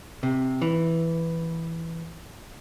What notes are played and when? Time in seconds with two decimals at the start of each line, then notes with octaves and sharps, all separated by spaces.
0.23 C3
0.62 E3